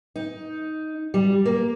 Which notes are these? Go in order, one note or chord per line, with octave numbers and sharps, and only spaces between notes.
D#4
G3
A#3